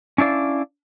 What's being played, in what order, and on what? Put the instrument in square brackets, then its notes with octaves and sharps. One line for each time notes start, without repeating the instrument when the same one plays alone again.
[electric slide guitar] C#4 D4 E4 D5 F5